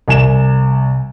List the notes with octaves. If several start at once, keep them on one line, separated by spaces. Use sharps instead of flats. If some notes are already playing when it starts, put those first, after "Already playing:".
C2 G#5 E7